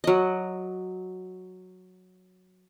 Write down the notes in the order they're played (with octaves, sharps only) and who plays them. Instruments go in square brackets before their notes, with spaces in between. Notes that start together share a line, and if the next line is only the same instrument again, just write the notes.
[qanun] F#3 D#5